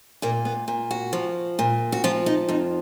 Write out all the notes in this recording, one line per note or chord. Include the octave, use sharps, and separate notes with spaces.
A#2 A#3
B3
A#2
F#4
F3
A#2
F#4
F3 F4
D#4
F2 D#4